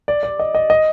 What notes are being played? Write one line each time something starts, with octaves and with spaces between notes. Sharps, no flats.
D5
D5
D#5
D#5
D#5